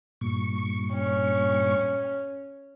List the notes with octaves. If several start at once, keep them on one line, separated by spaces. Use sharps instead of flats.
G2 A#2 C#6
C#4